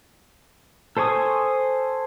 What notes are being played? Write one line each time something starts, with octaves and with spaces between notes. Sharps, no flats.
A4 C5 G#5 C#6 D#6